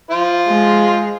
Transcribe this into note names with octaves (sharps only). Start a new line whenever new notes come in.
F4 C5
G#3